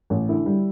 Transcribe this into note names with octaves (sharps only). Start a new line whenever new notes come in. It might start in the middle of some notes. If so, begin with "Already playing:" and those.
A1
D3 E4
G3